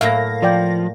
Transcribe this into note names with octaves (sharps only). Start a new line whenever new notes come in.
A2 F#3 A#3 E5 F5 A#6
F3 A#4 D5 G5